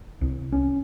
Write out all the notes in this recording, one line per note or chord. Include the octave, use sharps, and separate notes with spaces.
C2
C#4